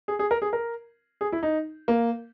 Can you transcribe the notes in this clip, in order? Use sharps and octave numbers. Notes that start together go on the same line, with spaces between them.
G#4
G#4
A#4
G#4
A#4
G#4
E4
D#4
A#3